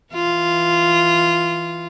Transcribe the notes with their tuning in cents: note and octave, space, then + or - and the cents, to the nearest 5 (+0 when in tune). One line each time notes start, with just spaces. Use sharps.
E3 +0 F4 -10